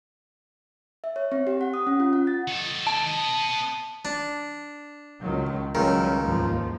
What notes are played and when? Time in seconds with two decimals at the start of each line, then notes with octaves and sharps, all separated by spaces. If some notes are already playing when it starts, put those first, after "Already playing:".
1.04 E5
1.16 C#5
1.32 C4
1.47 G4
1.61 F#5
1.74 D#6
1.87 C#4
2.00 F4
2.13 F#5
2.27 A6
2.48 D#3 A4
2.87 A5
3.06 B3 D#5
4.05 D4
5.21 C#2 D#3 F#3
5.75 C#2 D#3 F#3 G3 C#4
6.20 D#2 G#2 F3